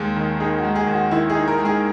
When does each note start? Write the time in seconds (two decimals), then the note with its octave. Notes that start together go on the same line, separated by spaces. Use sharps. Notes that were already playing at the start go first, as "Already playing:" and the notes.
Already playing: D#2 G#3 G#4
0.16 D#3
0.40 D#4 G#4
0.58 F#4
0.64 G#3
0.75 G#4
0.87 D#2
0.93 F#4
1.11 D#3 E4
1.30 G#4
1.35 D#4
1.48 A#4
1.60 G#3
1.65 G#4